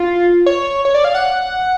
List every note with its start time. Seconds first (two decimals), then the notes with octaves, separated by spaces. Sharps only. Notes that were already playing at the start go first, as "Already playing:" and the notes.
Already playing: F4
0.46 C#5
0.85 C#5
0.95 D5
1.04 F5
1.15 F#5